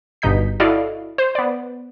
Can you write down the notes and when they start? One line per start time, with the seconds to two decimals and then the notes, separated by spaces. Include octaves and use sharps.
0.22 G1 G2 B2 D#4 G6 B6
0.60 E4 F#4 A4 D5 D#5 F5
1.18 C5
1.35 B3 D5